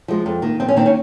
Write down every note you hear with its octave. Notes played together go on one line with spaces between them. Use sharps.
F3 G#3
F2
D#3 A#3
F2 C4
C#4
D#3 A#3 C4
C#4